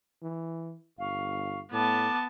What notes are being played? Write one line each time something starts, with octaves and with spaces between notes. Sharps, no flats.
E3
G1 F5 C#6
A2 B3 A5 D6